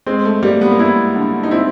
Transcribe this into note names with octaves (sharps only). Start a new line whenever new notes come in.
G#3 C4
A3
G3 A#3
B3
A#3
B3 E4
D3
D#4
C4 E4